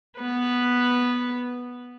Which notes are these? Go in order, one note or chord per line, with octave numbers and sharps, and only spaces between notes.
B3 B4